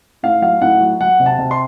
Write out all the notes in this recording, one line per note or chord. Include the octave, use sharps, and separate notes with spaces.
A2 F5
F#3 F5
A2 F#5
F#3
F#3 F#5
C3
A5
C3
C6